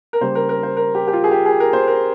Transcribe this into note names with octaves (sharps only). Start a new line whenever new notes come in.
A#4
C#3 G3 A#3 C5
A#4
A#4
C5
A#4
G4
G4
F4
G#4
G4
G#4
A#4
C5
A#4